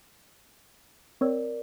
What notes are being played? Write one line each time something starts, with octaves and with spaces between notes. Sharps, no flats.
C4 A#4 C#5 D5 E6